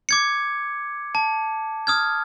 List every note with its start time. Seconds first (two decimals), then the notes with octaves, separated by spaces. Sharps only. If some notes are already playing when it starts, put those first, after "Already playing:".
0.09 D6 G#6 C#7
1.15 A5
1.87 D#6 F6 G#6